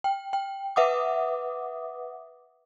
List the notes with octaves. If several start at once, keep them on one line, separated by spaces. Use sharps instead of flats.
G5
G5
B4 E5 F#5 D6 D#6